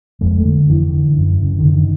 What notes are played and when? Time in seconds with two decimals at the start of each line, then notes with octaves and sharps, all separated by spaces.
0.21 F2 G#3
0.37 A3
0.45 D3
0.69 F2 E3
0.93 D3
1.17 F#2
1.41 C#3
1.59 D3
1.65 F#2 D#3